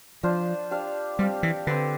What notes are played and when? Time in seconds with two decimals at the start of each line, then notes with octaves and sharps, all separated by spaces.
0.23 F3 D4 F4 C5
0.71 D4 G4 C5 F5
1.19 G3 C4 G4 C5 F5
1.43 E3
1.67 D3 C4 G4 B4